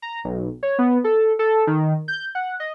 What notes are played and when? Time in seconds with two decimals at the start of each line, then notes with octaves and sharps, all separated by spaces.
0.02 A#5
0.24 B1
0.63 C#5
0.79 B3
1.04 A4
1.39 A4
1.67 D#3
2.08 G6
2.35 F#5
2.60 D#5